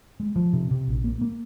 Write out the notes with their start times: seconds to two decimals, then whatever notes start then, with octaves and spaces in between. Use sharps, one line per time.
0.20 G#3
0.36 F3
0.53 C3
0.71 C3
0.88 A#1
1.04 A#3
1.21 A#3